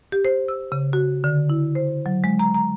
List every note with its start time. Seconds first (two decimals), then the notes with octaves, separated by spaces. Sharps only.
0.12 G4
0.25 C5
0.48 E6
0.72 C#3
0.93 F#4
1.24 D3
1.50 E4
1.75 C5
2.06 F#3
2.24 G#3
2.39 A#5
2.54 A#5